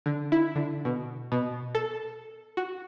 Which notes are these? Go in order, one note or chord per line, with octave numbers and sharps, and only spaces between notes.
D3
E4
D3
B2
B2
A4
F#4